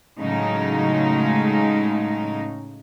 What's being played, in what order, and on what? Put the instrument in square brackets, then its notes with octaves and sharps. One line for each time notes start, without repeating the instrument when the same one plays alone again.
[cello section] A2 C#3 F#3 G#3 D#4